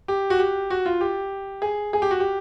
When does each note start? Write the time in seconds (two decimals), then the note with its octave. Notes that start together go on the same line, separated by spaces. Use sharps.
0.08 G4
0.30 F#4
0.39 G4
0.70 F#4
0.86 F4
1.01 G4
1.62 G#4
1.93 G#4
2.02 G4
2.11 F#4
2.20 G4